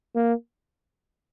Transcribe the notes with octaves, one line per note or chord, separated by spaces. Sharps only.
A#3